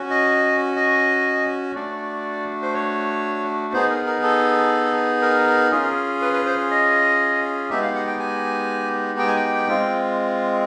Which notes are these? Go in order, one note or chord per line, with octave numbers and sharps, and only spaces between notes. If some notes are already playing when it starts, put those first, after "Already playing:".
Already playing: C#4 F#4
D#5
D#5
A3 D4 F#4 D5
C5
C#5
B3 D#4 G#4 C5
A#4
A#4
A4
A#4
C#4 F4 G#4
B4
B4
C5
D#5
G#3 B3 D#4 G4 E5
F5
F#5
G5
G#5
G5
G#5
G5
G#3 C4 F4